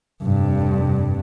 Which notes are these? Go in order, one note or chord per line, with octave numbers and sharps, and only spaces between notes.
F1 G2